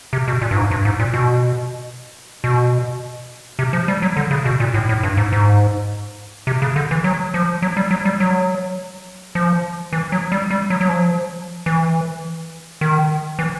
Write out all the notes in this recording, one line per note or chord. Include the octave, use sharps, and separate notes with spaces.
C3
B2
A#2
G2
G#2
G2
G#2
A#2
B2
B2
C3
F3
G3
F#3
D3
C#3
B2
A#2
A2
A2
G2
G#2
G#2
C3
C#3
D3
E3
F#3
F3
F#3
G3
F#3
G3
F#3
F3
E3
F#3
G3
G3
F#3
F#3
F3
E3
D#3
E3